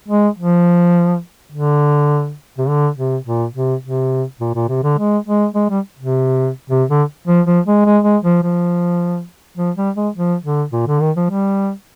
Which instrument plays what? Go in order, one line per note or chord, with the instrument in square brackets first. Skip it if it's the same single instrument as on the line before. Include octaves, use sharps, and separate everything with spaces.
[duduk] G#3
F3
D3
C3
D3
C3
A#2
C3
C3
A#2
A#2
C3
D3
G#3
G#3
G#3
G3
C3
C3
D3
F3
F3
G#3
G#3
G#3
F3
F3
F3
G3
G#3
F3
D3
A#2
D3
D#3
F3
G3